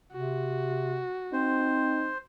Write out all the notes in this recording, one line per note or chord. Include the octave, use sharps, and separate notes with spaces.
C3 F#4
C4 D#4 C5